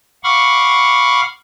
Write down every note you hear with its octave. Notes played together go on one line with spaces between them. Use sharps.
F5 F#5 B5 C#6 D6 F6